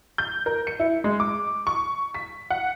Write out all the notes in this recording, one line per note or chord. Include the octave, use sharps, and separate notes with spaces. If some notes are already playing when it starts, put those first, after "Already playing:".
G6
A#4
C#7
E4
G#3
D6
C#6
B6
F#5